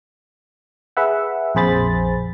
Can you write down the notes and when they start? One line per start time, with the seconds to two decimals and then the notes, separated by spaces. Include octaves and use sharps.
0.97 G#4 B4 E5 F#5
1.55 A#1 F2 G#4 C5 B5 A6